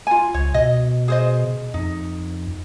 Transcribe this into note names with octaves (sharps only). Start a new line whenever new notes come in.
F4 G#5
C#2 C#5
B2 D#5
G#4 C5 D#5
F2 D#4